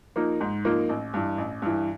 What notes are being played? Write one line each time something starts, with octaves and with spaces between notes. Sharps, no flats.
F3 A#3 D#4
G#2
F3 A#3 D#4
A1
G2 E3
A1
G2 E3